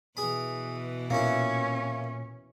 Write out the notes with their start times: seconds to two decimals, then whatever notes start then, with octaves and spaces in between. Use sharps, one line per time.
0.17 B2 E3 G#4 B5
1.10 A#2 A#3 C#4 E4